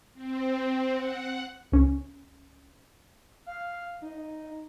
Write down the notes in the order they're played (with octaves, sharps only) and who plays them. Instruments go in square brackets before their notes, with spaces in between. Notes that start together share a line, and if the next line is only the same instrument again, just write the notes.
[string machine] C4
F#5
[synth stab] C#2 C#4
[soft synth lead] F5
D#4